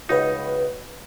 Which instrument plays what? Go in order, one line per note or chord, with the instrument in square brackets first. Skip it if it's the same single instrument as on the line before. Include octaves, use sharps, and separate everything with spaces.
[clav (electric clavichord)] C#2 D#4 [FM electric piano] F#4 B4